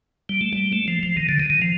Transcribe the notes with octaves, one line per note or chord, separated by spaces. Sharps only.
G3
A3
G3
A3
F3
F3
D#3
D3
D#3
D#3
F3